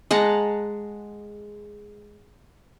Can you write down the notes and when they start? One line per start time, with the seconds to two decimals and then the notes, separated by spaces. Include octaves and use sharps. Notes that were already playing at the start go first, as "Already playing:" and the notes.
0.11 G#3 F#5 A5 A#5